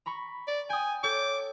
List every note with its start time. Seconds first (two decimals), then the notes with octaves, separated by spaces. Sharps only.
0.06 A#5 B5 C#6
0.48 D5
0.70 G5 G#5 D#6
1.03 A4 C#5 D6 G6